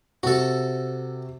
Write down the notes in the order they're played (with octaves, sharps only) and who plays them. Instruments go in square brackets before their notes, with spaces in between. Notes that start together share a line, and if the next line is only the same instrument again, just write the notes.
[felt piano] C3 [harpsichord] F#4 A4